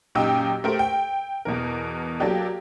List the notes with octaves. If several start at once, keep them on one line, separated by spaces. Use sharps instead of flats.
F#2 A#2 D#4 G4 G5 E6
A3 G4 A#4 C5
G5
E2 B2 E3 A#4
F#3 A#3 D4 G4 A4